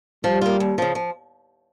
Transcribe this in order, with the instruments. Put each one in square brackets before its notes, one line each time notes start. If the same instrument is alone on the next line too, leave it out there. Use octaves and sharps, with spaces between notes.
[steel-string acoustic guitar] F3 [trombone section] G3
[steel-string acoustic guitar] A#3 F4
D#2
C#3 F3
F3